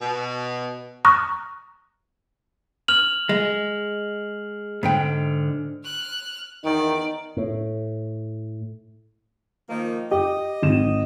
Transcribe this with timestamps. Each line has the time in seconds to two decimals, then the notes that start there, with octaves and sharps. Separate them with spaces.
0.01 B2
1.05 A#5 C#6 D#6 F6 F#6 A#6
2.88 F6 F7 F#7
3.29 G#3
4.83 G#2 D3 G5
5.85 F6 F#6
6.64 E2 D#3 D#4 D5
7.37 A2
9.69 D#3 F3 A#3
10.11 G4 D#5
10.63 G#1 E7